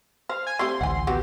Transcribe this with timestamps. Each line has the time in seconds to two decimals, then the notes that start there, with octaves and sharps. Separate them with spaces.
0.29 C5 F5
0.47 G#5
0.59 A3 C4 G4 C6
0.81 A1 D2 E3 F#5 G#5
1.07 F#3 B3 F#4 G4